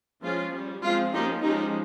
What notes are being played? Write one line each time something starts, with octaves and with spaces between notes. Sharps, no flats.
F3 G#3 C#4 F4
G3 C#4
F3 G#3 C4 F4
F3 A#3 C#4 D#4 G4
F3 G#3 C#4 D#4 G4